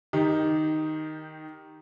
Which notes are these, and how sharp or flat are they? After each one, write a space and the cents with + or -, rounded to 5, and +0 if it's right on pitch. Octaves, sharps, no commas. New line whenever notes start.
D#3 +0 D#4 +0 G4 +10